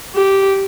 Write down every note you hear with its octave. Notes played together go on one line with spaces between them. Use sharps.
G4